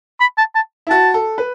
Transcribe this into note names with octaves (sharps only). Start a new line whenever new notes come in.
B5
A5
A5
E4
F#4 A5
A4
B4